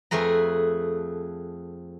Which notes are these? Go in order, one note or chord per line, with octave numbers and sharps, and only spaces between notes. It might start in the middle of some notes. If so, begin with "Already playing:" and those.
F2 A3 G#4 B4 A#5